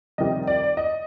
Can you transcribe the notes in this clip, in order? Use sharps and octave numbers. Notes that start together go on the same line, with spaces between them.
F2 C3 D#3 G3 D#5
D5
D#5